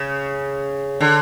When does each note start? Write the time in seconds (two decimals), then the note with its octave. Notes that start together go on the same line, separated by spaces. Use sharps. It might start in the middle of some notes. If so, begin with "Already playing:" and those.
Already playing: C#3
1.01 D3